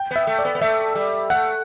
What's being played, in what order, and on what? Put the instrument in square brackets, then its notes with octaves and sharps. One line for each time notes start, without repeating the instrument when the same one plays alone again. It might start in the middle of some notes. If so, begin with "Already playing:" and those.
Already playing: [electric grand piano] G5
[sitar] B3 [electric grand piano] E5
[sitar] A3
[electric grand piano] D5
[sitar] B3
B3
[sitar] A3 [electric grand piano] E5
[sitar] G3
[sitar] A3 [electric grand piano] F#5